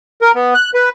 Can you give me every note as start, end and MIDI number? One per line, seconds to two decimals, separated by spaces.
0.22 0.32 70
0.35 0.54 59
0.55 0.71 90
0.74 0.89 71